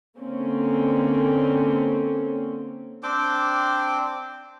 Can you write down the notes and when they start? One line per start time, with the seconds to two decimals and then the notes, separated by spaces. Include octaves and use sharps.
0.19 D3 A#3 C4 C#4
3.03 C4 D4 G5 D6